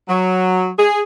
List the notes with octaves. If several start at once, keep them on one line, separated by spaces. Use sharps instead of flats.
F#3
G#4